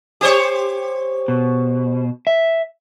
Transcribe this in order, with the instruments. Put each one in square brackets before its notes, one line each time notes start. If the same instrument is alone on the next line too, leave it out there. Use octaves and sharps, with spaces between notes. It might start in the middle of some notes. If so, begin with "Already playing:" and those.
[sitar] G4 C5 C#5
[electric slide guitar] B2
E5